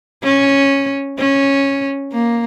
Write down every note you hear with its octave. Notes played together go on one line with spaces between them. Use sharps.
C#4
C#4
A#3